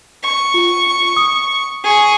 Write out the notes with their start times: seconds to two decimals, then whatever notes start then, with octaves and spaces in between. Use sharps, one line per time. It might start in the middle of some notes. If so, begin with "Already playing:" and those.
0.23 C#6
0.54 F4
1.16 D#6
1.84 G#4 C#6